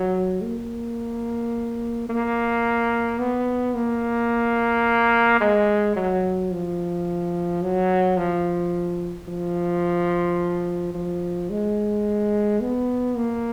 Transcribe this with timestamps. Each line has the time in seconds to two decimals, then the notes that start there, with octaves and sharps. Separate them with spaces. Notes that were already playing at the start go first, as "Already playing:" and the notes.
Already playing: F#3
0.42 A#3
2.09 A#3
3.19 B3
3.74 A#3
5.41 G#3
5.96 F#3
6.51 F3
7.62 F#3
8.17 F3
9.28 F3
10.94 F3
11.50 G#3
12.61 B3
13.17 A#3